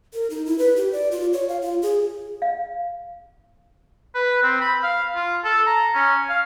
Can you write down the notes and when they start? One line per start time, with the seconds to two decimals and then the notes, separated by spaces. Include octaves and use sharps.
0.14 A#4
0.30 D#4
0.46 E4
0.58 B4
0.76 G4
0.93 D5
1.11 F4
1.33 C#5
1.49 F5
1.62 F4
1.82 G#4
2.42 F5
4.15 B4
4.43 C4
4.61 B5
4.83 F5
5.16 F4
5.44 A4
5.66 A#5
5.95 C#4
6.29 F5